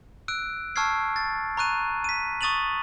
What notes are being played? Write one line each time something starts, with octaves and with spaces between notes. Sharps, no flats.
E6 F#6 D7
A5 C#6 E6 F6 G#6 C7
A6
A#5 C#6 F#6 D#7
B6 D#7
C#6 D#6 A6 D#7 F7 F#7